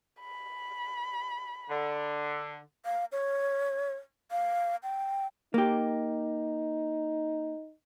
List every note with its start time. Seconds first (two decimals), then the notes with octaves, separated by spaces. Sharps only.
0.20 B5
1.69 D3
2.85 F5
3.12 C#5
4.31 F5
4.83 G5
5.54 A#3 D#4 G4